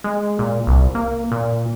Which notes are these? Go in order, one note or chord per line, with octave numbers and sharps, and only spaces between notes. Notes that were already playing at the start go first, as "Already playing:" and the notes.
G#3
A#2
C2
A#3
A#2